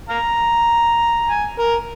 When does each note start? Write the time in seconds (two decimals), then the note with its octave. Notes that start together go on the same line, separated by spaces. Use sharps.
0.09 F5 A#5
1.29 G#5
1.59 A#4